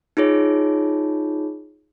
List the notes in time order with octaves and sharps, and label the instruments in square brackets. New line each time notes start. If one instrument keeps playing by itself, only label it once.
[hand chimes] D#4 F4 G#4 C#5